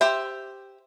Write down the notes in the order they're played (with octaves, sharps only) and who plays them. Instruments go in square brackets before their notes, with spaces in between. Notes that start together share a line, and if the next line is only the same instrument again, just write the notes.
[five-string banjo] G4 C5 E5